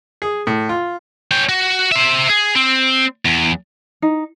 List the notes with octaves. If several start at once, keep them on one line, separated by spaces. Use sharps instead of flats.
G#4
A2
F4
C#4 G5
F#4
C5 E5
G#4
C4
E2
D#4